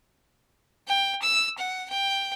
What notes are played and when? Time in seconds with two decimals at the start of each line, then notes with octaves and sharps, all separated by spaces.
0.87 G5
1.22 E6
1.58 F#5
1.90 G5